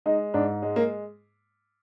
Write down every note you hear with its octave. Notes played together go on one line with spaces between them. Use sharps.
G#3 D#4
G#2 D4
G#3
A#3